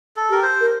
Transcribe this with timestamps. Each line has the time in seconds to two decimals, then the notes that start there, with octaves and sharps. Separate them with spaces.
0.16 A4
0.30 G4 A#4
0.42 C5
0.61 A#4